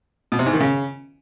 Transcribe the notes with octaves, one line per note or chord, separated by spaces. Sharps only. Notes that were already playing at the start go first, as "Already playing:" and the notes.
B2
C3
G#2
D#3
C#3